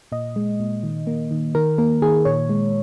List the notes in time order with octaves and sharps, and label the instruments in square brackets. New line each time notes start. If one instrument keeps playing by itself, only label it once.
[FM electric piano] A#2 D#5
G#3
A#2
D#3
A#3
D#3
D#3 A#4
A#3 A#4
D#3 G#4
A#2 C#5
G#3